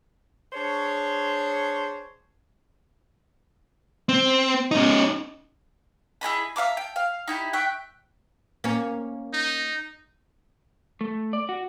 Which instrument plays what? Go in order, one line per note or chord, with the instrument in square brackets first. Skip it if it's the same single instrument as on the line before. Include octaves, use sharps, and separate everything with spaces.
[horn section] D4 G#4 C5 C#5
[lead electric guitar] C4
C#4 D#4
[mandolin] E4 G#4 D#5 B5
E5 F5 A#5 D6
G5
F5
D#4 E4 G4
E5 G5 C#6 F#6
[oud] A#3 C#4
[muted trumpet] D#4
[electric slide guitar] A3
D5
F#4